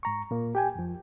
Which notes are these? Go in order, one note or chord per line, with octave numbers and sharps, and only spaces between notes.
G#2 A#5 C#6
A#2 A#3
G4 G5 G#5
F2 F3